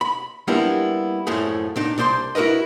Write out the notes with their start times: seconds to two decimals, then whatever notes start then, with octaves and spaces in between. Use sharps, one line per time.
0.01 B5
0.48 G3 A#3 B3 D4 E4 F4
1.27 F#2 A2 F3 A3 E4 G#4
1.76 A#2 D4 D#4
1.98 C2 D4 C5 D5 C6
2.35 E4 F#4 A#4 B4 D#5